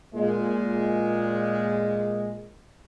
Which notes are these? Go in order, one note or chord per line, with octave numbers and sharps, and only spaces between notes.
A#2 G#3